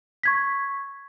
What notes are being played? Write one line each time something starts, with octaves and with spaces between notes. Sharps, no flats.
C#6 G#6 B6